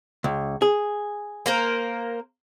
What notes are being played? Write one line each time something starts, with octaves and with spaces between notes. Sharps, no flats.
C#2
G#4
A#3 A#4 C5